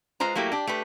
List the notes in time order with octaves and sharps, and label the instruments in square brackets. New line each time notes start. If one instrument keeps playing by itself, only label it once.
[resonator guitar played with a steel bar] G#3 F4 B4 C5 A#5
F#3 A3 A#3 E4 G4
D4 G4
A3 G4 B4